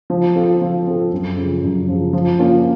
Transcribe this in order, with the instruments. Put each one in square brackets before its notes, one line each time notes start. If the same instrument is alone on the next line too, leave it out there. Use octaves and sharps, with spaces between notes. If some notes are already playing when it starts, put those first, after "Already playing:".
[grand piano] F3
C4 F4 A4
F3
C4 F4 A4
F#2
C#3 F3
F#2
C#3 F3
F3
A#3 C#4 F4